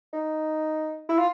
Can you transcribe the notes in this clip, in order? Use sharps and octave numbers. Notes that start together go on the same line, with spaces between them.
D#4
E4
F4